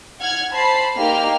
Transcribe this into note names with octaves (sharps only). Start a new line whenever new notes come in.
F#5 F6 G#6
C5 A5 B5 C7
A#3 D#4 G4 F6